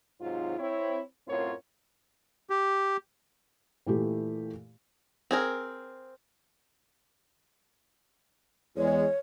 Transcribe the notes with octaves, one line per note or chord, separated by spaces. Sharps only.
G#2 C3 F#3 D#4 F4
C4 E4 C#5
F#2 A2 C4 F4 A#4 C#5
G4
A#2 E3 A3 G4
C4 G#4 A#4
E2 G#3 C#5